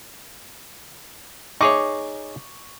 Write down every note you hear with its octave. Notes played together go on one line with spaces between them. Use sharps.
D#4 G#4 C#5 C#6 D6